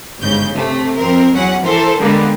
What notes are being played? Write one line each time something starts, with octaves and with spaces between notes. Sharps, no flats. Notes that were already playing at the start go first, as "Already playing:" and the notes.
G1 G#2 C#3 G6
C3 A3
F2 C4 A#4
E2 F#3 C#4 F#5
E3 A4 A#4 C5
D3 G3 G#3 A#3 B3